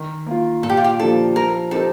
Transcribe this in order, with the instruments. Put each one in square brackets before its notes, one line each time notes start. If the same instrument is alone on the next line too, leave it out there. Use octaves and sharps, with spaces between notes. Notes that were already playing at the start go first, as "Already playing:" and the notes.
Already playing: [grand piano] D#3
A#3 F4
[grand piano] A#2 [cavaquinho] A4
[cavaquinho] G4
F4
G4
[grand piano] F3 A#3 D4 G4 [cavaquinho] A4
[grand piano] F3 [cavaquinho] A#4
[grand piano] C4 D#4 G4 A#4 [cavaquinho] A4